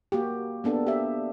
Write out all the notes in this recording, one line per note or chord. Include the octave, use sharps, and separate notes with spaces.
A#3 F#4 G4
A#3 B3 D4 A4
G4 E5